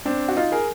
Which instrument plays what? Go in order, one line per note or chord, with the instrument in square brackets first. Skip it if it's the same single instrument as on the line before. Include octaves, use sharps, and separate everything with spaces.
[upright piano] C4 D4
F#4
D#4 F4
G#4 A#4